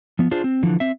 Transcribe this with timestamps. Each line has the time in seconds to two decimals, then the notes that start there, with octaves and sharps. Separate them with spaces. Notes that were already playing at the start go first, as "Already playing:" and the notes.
0.19 F3 B3
0.31 D4 F4 G#4 C5
0.44 C4
0.63 D3 E3 F3
0.80 C4 E5